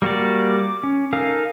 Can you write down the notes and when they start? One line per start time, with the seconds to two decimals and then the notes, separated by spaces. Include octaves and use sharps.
0.02 G3 A#3 F#4 G4 D5
0.59 D6
0.83 C#4
1.13 D#4 A4 A#4 F5 G#5